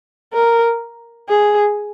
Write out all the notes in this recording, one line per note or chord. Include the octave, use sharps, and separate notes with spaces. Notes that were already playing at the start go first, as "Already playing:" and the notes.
A#4
G#4